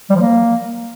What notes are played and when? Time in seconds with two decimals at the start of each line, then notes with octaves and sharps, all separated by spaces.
0.10 G3
0.15 F3
0.21 A#3